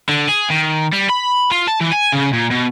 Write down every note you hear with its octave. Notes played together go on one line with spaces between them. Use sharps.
D3
G#4
D#3
G3
B5
F4
A5
E3
G#5
C#3
A#2
B2